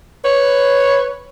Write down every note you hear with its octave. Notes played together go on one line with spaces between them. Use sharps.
B4 C#5